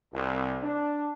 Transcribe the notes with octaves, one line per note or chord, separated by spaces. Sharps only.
C2
D4